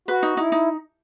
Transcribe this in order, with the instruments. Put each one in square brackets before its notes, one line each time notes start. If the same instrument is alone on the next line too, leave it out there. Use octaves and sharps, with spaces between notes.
[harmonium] F#4 [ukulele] B4
[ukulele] D#4
[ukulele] D#4 [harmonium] E4
[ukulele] D#4